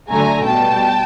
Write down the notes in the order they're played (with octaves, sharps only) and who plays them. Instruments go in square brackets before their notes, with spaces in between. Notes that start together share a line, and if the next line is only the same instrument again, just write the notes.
[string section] D3 F#3 A3 G#5 A#5
B2 G3 G5 A5